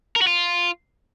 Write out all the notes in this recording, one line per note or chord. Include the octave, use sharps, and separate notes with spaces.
A#4
F#4
F4